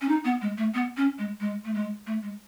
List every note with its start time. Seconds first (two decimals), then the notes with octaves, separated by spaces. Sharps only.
0.01 C#4
0.09 D#4
0.25 B3
0.41 G#3
0.58 A3
0.74 B3
0.97 C#4
1.18 G#3
1.40 G#3
1.65 A3
1.74 G#3
2.07 A3
2.23 G#3